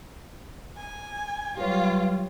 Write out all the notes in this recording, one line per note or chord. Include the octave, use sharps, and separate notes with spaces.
G#5
F#3 G3 F4 G4 B4 C#5